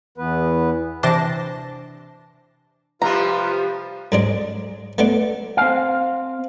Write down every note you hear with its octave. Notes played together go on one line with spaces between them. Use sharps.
E2 E3 B3 B4
C3 E3 D4 C5 A5 A#6
C3 F3 G3 F4 B4 A#5
G#2 G#3 D4
A3 B3 D4
C4 F5